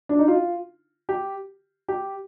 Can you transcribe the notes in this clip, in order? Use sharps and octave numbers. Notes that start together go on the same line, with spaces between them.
D4
D#4
F4
G4
G4